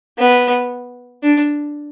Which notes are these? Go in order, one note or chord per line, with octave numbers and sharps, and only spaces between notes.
B3
D4